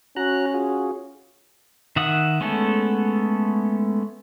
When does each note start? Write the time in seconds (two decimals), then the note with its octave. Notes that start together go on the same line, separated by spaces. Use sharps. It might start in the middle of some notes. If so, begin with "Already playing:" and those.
0.17 C#4 F#4 A#5 F#6
0.54 F4 F#4 G#4
1.96 D#3 E5 F#5 D#6
2.41 G#3 A3 B3 C#4 A4